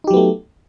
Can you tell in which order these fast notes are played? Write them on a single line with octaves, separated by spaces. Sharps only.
D#4 G4 F#3 B3 A3